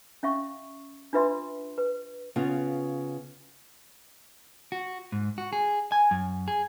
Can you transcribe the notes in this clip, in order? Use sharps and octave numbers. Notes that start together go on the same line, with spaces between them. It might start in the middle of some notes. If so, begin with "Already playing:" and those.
C#4 E5 F5 C#6
D4 F4 B4 E5 C6
B4
C#3 B3 F4
F#4
G#2
F#4
G#4
G#5
F#2
G#4